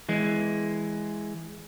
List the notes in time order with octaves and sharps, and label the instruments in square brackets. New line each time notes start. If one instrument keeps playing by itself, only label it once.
[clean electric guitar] E3 G#3